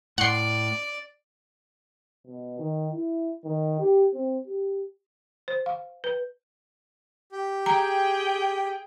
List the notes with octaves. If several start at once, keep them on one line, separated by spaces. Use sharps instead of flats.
A2 D5 F#5 C6
B2
D#3
E4
D#3
G4
C4
G4
C5
F5
B4
G4
G#4 G5 A#5